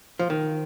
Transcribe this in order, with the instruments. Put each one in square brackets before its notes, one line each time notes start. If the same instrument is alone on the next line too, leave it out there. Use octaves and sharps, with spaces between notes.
[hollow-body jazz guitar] F3
D#3